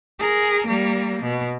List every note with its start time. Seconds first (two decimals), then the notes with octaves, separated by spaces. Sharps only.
0.19 G#4 A#4
0.67 G3 A#3
1.22 B2